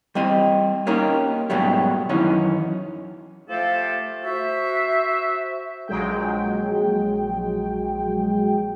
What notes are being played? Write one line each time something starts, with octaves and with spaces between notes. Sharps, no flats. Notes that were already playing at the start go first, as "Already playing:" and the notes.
G3 C4 D#5
A#3 C#4 D#4 G4 A#4
G#2 B2 F#3 G3 A3
F#2 D#3 E3 C#4 D#4
F3 A3 G4 A4 F5
F#4 C5 E5
A#1 F#3 G#3 G5